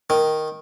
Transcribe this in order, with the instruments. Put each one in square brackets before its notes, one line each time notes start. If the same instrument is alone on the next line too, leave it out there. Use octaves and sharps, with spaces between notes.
[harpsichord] D#3